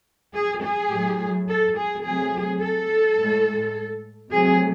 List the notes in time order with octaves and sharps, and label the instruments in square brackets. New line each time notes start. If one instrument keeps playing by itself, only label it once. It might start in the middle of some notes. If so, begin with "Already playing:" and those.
[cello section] G#4
G#4
A2 F#3 A3
A4
G#4
C3 F#3 A3 G#4
A4
A2 G#3
C3 F#3 A3 G#4